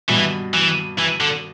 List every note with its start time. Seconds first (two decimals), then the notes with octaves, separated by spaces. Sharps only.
0.09 G2 B2 E3
0.54 E3
0.99 E3
1.21 D3